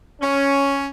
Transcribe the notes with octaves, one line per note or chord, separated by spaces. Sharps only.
C#4